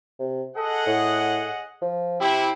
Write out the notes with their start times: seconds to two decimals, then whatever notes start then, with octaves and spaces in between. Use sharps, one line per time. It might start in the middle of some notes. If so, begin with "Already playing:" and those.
0.19 C3
0.56 G#4 A4 D#5 F#5
0.86 A2
1.82 F3
2.20 C3 C4 E4 G4